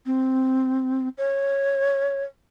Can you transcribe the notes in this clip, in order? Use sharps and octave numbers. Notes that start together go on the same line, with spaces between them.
C4
C#5